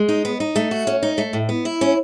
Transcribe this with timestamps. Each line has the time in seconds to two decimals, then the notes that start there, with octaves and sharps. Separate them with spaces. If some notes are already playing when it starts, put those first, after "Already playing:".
Already playing: G#3
0.09 D#4
0.25 B3
0.40 D#4
0.56 A3
0.71 F#4
0.87 C#4
1.03 D#4
1.18 A3
1.33 A2
1.49 B3
1.65 E4
1.81 C#4